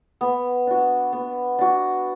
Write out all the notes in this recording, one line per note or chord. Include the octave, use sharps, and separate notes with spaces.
B3
D4 F#4
B3
D4 F#4